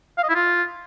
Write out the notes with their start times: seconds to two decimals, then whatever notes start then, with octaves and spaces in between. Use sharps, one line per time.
0.18 F5
0.23 D#5
0.29 E4
0.35 F4